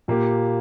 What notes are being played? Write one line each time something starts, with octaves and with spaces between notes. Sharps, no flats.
A#2 A#3 G4